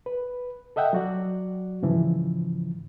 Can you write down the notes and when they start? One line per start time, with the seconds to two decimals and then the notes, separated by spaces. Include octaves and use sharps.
0.06 B4
0.76 A4 D#5 E5 F#5 G5
0.93 F#3 F#4 D5
1.83 G#2 C#3 E3 F3